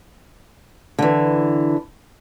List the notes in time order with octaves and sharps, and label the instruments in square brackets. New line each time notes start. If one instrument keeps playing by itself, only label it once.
[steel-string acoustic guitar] D3 E3